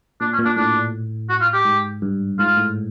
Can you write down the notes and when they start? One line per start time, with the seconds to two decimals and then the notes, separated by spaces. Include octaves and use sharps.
0.21 A#2 D4
0.33 C#4
0.39 A#2
0.45 D4
0.56 A2 D4
1.29 F#4
1.41 F4
1.53 G4
1.65 G#2
2.02 G2
2.39 G#2 F4
2.57 A2